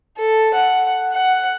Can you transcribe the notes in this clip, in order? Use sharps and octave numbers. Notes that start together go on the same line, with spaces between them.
A4
F#5
F#5